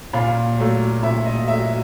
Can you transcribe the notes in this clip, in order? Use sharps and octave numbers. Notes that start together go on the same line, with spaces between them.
A#2 F5
F#3 A3
A#2 E5
D#5
F#3 A3 E5